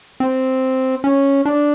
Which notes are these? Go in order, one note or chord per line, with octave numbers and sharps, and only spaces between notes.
C4
C#4
D4